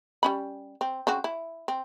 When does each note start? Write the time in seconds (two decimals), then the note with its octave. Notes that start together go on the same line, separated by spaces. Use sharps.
0.23 G3 C#4 B5
0.81 C4
1.07 C#3 C4 F#4
1.24 E4
1.68 C4